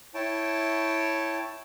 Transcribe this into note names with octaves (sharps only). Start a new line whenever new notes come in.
E4 C#5 G5 A5